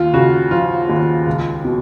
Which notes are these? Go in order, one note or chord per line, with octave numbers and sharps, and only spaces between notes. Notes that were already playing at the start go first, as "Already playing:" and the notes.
Already playing: D#2 F4
C#3 F#4
F3 F4
D#2
C#2
B2